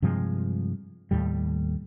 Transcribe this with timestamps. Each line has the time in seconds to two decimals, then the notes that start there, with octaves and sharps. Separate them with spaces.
0.02 G2 C3 F3 G#3
1.11 D#2 A2 G3